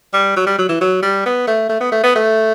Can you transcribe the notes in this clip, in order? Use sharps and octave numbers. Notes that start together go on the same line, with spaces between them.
G3
F#3
G3
F#3
E3
F#3
G3
B3
A3
A3
B3
A3
B3
A3